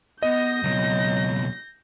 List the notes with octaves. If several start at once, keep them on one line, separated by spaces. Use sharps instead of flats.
B3 D#5 G6 A#6
C#2 B2 F#3